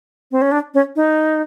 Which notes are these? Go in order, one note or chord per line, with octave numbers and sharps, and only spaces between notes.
C4
C#4
D4
C#4
D#4